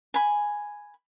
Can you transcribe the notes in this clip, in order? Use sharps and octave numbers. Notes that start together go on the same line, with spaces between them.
G#5 B5